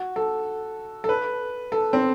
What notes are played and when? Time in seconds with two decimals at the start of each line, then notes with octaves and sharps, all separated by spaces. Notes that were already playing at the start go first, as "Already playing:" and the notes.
Already playing: F#4
0.16 A4
1.04 A4
1.09 B4
1.72 A4
1.93 C4